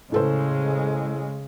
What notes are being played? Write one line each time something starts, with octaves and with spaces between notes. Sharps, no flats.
A2 C#3 G#3 A4 C5